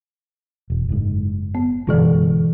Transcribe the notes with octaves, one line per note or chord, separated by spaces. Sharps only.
E1
F#1 G#2
B3
F#1 G2 B2 D3 E3 G#3